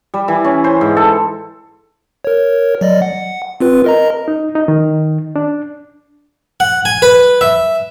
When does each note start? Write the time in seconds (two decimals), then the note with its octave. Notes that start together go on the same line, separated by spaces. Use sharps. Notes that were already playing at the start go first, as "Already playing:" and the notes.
0.14 G3
0.28 E3
0.44 C#4
0.64 C5
0.81 G#2
0.97 A4
2.25 A#4 C#5
2.81 F#3 D5 D#5
3.02 F#5
3.60 C4 F4 B4
3.84 A#4 D#5 A#5
4.28 D#4
4.55 D#4
4.68 D#3
5.36 D4
6.60 F#5
6.85 G#5
7.02 B4
7.41 E5